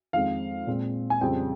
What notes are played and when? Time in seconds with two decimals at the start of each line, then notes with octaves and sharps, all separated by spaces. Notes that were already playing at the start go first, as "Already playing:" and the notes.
0.13 F2 D#3 G#3 C4 F5
0.67 A#2 G#3 C4
1.10 G#5
1.21 F2 C#3 G3 C4 G5